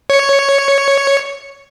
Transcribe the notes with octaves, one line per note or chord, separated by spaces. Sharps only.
C#5 C#7